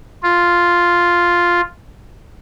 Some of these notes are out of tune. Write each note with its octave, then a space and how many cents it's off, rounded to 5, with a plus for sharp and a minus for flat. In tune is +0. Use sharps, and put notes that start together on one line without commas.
F4 +0